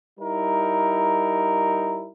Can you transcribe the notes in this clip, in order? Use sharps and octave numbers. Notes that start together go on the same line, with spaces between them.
G3 D#4 E4 A#4